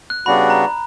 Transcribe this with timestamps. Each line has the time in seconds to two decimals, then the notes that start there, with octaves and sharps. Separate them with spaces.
0.10 F#6
0.26 C#3 G3 B3 D4 F#4 B5
0.50 A#5